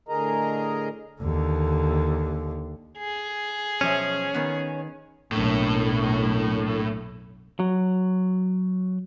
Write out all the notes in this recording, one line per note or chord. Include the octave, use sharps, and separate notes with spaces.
A2 D3 G#4 A#4 D#5 A#5
D#2 D3
G#4
B1 F3 C#4 E5
D#3 B3
B1 F#2 A2 A#3 D4 A#4
F#3